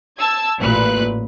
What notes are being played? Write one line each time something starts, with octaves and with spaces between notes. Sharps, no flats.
A5 E6 G#6
A1 A#2 B4 F#6